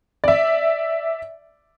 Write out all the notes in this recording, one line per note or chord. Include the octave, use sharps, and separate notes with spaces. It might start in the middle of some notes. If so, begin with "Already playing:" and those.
D5 E5